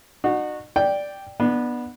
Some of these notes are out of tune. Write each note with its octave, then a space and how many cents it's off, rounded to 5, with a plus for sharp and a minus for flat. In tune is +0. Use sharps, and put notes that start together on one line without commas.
D#4 -45 F#4 -10
D5 +0 G5 +0
B3 -15 D4 +25